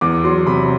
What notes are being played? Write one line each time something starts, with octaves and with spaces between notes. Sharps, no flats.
E2 D6
F#3 C6
C3 B5